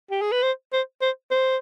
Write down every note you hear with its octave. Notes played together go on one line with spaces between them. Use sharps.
G4
G#4
B4
C5
C5
C5
C5